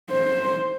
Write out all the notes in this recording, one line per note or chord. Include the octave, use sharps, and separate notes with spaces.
C5